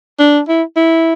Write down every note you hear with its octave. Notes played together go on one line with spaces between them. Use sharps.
D4
E4
E4